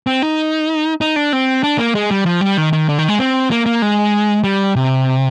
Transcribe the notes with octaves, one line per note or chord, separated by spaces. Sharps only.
C4
D#4
D#4
D4
C4
D4
A#3
G#3
G3
F3
G3
D#3
D#3
D3
D#3
G#3
C4
A#3
A#3
G#3
G3
C3